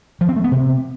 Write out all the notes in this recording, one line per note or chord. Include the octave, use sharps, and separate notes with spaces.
F3
C4
A3
B3
C3